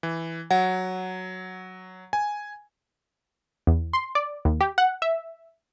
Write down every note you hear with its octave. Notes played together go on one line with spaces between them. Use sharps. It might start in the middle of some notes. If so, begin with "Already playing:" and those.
E3
F#3 F#5
G#5
E2
C6
D5
D#2
G4
F#5
E5